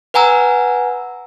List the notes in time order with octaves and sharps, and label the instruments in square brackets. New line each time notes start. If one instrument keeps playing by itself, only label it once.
[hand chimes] B4 F#5 G#5 A#5 E6